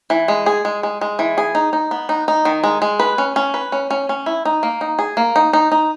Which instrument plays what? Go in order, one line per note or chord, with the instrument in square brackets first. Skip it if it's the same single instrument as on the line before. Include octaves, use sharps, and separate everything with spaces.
[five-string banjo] E3
G#3
G#4
G#3
G#3
G#3
E3
G#4
D#4
D#4
B3
D#4
D#4
D#3
G#3
G#3
B4
C#4
C#4
B4
C#4
C#4
C#4
E4
D#4
A#3
D#4
G#4
A#3
D#4
D#4
D#4